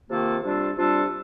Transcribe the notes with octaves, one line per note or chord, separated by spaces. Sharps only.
C3 D#3 A#3 F4 A4
C3 G3 D4 F4 A4
C3 G3 D4 F4 A4